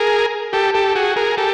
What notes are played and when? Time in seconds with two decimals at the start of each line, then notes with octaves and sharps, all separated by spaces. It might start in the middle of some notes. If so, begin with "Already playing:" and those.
Already playing: G#4 A#4
0.53 G4 A4
0.74 G4 A4
0.95 F#4 G#4
1.16 G#4 A#4
1.37 G4 A4